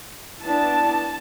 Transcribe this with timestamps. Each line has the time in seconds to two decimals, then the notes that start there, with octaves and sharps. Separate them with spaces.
0.42 E3 B3 D4 A5